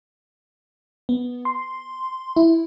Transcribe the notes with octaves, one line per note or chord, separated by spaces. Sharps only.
B3
C6
E4